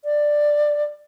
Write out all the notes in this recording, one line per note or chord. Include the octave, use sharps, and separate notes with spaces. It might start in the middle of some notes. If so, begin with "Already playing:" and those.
D5